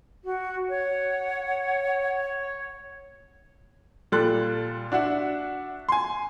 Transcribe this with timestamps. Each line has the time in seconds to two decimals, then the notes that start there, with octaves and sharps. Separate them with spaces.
0.24 F#4
0.70 C#5 F#5
4.12 A#2 G3 A4 C6 F#6
4.92 D4 F#4 E5 F#5
5.89 G#5 C6